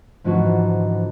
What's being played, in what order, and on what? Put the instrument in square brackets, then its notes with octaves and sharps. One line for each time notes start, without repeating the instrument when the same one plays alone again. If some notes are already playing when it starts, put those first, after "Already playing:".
[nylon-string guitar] G#2 D3 E3 F3 D#4 F#4